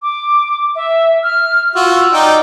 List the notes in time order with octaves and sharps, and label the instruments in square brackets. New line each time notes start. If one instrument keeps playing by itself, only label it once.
[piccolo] D6
E5
F6
[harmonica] F4 F#4 [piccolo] E6
[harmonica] D#4 D5 G5